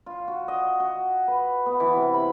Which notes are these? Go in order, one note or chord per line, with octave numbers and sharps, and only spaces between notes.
F4
F#4
D#5
F#4
B4
B3
E3
C3
B5